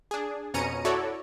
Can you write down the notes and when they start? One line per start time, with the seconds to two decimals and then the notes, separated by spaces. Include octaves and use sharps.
0.11 D4 G#4
0.54 F2 B2 C#4 A#5 C#7 D#7
0.85 E4 F#4 A4 C#5 D5